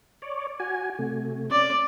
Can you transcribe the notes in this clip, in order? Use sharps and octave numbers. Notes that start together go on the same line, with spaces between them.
C#5 D5
F#4 G#5
C3 A3
C#4 D5